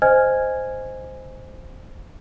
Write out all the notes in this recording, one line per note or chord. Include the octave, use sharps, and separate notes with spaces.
C5 D#5 G#5 F6 G#6